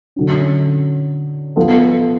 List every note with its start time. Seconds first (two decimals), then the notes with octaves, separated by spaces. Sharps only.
0.16 D3 F#3 C#4
1.56 F3 B3 F4 A4